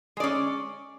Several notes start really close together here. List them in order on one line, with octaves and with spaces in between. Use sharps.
G#3 D5 C#4